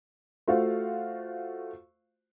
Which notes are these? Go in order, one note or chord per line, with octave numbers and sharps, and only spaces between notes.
A3 F4 F#4 C5 F5